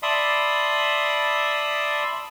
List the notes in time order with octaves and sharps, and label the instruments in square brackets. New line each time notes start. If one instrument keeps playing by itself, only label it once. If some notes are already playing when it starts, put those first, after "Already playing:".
[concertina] D5 E5 A5 B5 C6 D#6